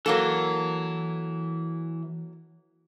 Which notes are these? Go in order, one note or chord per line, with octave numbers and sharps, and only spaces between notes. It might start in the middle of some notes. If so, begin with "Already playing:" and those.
E3 F#3 A#3 A4